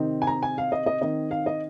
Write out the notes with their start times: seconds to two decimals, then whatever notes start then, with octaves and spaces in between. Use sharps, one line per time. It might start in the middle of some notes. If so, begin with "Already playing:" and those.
Already playing: C3 D#3 C4 D#4
0.22 G#5
0.27 A#5
0.43 G#5
0.58 F5
0.72 D#5
0.86 D#5
1.02 D#3 C4 D#4 D#5
1.31 F5
1.46 D#5